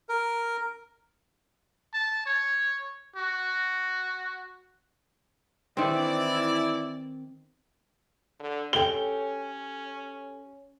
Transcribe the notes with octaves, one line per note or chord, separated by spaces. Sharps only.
A#4
A5
C#5
F#4
D#3 E3 C4 E4 D5
D3
C#4 G4 A4 G5 G7